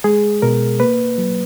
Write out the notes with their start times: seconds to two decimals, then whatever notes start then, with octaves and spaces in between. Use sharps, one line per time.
0.04 G#3 G#4
0.42 B2 A#4
0.80 A#3 B4
1.18 F#3